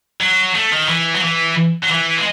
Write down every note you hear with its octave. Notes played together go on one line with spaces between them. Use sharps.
F#3
A3
D#3
E3
F#3
E3
F#3
E3
G#3